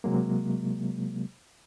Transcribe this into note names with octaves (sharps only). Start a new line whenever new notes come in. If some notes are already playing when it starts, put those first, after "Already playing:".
C3 F#3 G#3 A#3